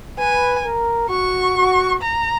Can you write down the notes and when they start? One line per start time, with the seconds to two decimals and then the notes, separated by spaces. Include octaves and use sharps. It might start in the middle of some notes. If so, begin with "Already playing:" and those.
0.18 B4 G#5
0.65 A#4
1.09 F#4 C#6
1.56 F#4
2.02 A#5